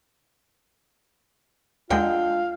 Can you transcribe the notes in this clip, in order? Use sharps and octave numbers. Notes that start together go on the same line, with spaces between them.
D#2 D3 G#3 F4 D5 F5 G5